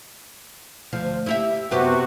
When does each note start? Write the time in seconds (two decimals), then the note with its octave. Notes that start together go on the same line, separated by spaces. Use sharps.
0.93 D2 F3
1.26 E4 G4 E5
1.71 F#2 C3 B3 F#4 G4